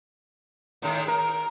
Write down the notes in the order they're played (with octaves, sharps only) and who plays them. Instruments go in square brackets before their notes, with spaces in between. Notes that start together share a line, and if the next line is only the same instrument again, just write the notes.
[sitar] A2 D#3 G#3
[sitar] A#4 [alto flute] A#5